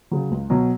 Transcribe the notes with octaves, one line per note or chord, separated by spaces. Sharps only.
C#3 F#3
C#2
B2 F#3